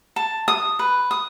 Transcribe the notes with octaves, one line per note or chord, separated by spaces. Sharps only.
A5
D#6
B4
D#6